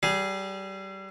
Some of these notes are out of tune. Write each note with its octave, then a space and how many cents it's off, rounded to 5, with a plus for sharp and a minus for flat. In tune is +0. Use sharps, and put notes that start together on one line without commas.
G3 -25 G#4 +5